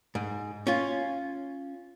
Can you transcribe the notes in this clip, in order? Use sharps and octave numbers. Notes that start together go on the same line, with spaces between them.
G#2
C#4 F4